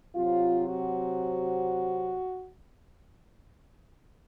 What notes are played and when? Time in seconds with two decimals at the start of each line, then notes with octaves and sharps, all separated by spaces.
0.15 C3 F#3 C4 F4
0.66 F#4